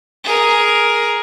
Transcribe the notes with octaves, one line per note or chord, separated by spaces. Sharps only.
G#4 A#4